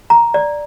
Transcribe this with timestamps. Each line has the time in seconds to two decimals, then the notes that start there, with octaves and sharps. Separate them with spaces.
0.10 A#5
0.34 D5